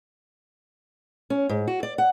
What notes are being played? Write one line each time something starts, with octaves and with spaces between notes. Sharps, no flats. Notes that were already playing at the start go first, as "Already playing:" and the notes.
C#4
G#2
F#4
D5
F#5